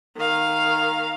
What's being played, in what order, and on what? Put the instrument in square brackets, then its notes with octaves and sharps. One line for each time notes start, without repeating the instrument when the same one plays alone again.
[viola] D#3 F5